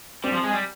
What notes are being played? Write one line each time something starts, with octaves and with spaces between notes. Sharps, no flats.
G3 C4
F3
G#3
G3